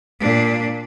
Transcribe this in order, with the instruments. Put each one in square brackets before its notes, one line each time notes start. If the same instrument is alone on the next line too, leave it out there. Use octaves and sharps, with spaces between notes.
[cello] A#2 D4